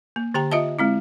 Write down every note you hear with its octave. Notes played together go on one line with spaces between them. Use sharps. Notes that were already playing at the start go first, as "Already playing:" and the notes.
A#3
D3 G4 G5 A#5
F4 D#5 E5 A5
G#3 C4 E4